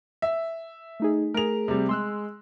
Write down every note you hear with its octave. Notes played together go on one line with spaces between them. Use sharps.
E5
A3 D#4 G#4
A3 G#4 A#4 F7
C3 G3
G#3 C6 E6 F#6